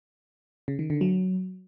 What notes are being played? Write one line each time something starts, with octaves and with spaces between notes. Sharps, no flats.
C#3
D#3
D3
F#3